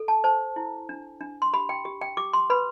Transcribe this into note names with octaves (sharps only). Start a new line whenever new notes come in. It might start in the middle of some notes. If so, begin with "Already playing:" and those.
Already playing: A4
A5
C5 A5
E4
D4
D4
C6
G4 B5
G5
G4
G5
G4 D6
C6
B4 B5